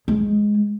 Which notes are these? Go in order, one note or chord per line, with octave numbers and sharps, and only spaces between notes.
G#3